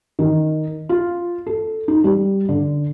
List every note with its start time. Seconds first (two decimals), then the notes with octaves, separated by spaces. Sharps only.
0.19 D#3
0.89 F4
1.46 A4
1.88 D#4
2.04 G3
2.49 D3